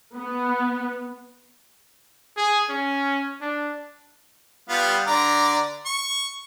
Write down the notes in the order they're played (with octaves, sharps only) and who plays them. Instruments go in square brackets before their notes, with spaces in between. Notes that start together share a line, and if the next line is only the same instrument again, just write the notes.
[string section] B3
[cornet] G#4
C#4
D4
[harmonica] G3 B3 F4
D3 D5 A#5
C#6